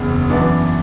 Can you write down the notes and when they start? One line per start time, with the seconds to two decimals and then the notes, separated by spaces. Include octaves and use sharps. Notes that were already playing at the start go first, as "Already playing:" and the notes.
Already playing: F#1 E2 C#3
0.29 F#2 E3 B3 D4